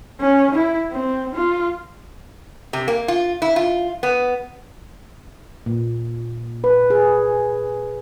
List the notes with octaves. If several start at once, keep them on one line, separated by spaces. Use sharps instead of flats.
C#4
E4
C4
F4
C3
A#3
F4
E4
F4
B3
A#2
B4
G#4